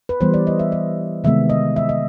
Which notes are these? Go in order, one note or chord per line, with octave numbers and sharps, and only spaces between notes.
B4
E3 G3 B3 C5
D5
D#5
E5
D#5
C3 D#3 G#3 B3 E5
D#5
E5
D#5